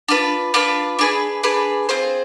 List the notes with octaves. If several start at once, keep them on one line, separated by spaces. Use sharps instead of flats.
D4 F4 B4
D4 F4 B4
D4 G#4 B4
D4 G#4 B4
C4 F4 G#4 C5